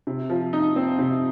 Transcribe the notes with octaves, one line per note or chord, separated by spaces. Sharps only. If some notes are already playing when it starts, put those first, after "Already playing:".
C3
F3
D#4
C4
C3